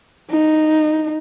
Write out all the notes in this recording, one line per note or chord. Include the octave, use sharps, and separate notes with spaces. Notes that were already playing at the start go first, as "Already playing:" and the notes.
D#4